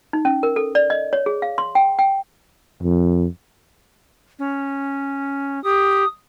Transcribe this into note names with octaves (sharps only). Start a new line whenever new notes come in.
D#4
C#4
A#4
A4
D5
D#5
C#5
G#4
F5
C6
G5
G5
F2
C#4
G4 D#6